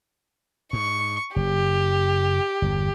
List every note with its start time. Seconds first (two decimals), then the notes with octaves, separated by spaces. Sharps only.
0.73 G#2 C#6
1.36 F#1 G4
2.62 G1 E2